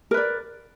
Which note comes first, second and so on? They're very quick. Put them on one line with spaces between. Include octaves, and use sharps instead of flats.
A#4 B4 D5